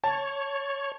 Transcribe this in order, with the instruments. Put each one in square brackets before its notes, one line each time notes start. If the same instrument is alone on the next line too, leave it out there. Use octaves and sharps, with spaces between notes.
[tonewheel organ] C#5 [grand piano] A5